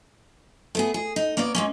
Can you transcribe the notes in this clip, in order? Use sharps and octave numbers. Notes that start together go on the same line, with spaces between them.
A3 B3 G#4
G#4
D#4
A#3 B3 C#5 D5
G#3 A#3 C#4